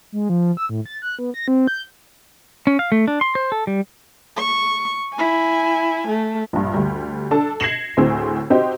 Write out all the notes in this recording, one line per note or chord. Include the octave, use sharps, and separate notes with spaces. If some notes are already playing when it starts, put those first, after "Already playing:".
G#3
F3
E6
A2
A6
F#6
B3
A#6
C4
G6
C#4
F5
A3
D4
C6
C5
A4
G3
C#6
E4 G#5
A3
A#1 G2
D2 G3
D4 A4 A5
G#6 A#6 C7 C#7 E7 F#7
D2 A2 C4 G#4 E6
C4 D#4 F#4 G4 C5